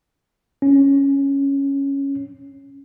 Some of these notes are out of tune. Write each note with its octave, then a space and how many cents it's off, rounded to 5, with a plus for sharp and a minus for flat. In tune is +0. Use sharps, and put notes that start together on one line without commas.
C#4 +0